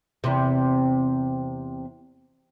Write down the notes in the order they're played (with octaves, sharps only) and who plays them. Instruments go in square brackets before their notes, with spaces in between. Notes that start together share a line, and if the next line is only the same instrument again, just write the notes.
[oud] E2 C3